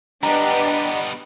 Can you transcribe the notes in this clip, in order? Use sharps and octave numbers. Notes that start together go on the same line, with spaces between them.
G3 B3 D4 G4 B4 D#5 F#5 A#5